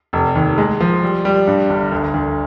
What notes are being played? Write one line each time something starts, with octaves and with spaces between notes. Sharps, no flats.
F1
D#2
G#3
F3
G3
G3
G2
G1
D2
D2